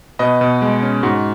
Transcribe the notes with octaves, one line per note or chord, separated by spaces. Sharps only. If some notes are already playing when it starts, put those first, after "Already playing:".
B2 B4 D#5
B2
G#3
C#4
G#2 F#4